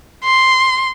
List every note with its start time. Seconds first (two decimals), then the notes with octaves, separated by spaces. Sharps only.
0.24 C6